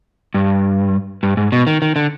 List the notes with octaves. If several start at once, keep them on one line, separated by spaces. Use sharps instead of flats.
G2
G2
G#2
B2
D#3
D#3
D3